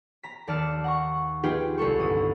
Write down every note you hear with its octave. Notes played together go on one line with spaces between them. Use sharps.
A#5 B6
D#2 D5 A5 F6 C#7 E7
F#5 A#5 C#6
D#4 F4 G4 G#4 B4 G5
C2 G#3 A4 C#6
G1 D#6